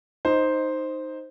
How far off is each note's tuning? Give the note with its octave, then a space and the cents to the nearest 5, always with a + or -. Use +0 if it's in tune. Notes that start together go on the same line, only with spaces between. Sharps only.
D#4 +0 C5 +0 D#5 +10